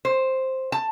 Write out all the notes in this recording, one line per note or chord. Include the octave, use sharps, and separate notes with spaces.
C5
A5